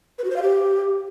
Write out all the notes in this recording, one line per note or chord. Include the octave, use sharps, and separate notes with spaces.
B4
F#4
C5
F5
G4